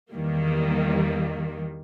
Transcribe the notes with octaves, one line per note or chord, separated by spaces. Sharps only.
E2 D#3 G3 A#3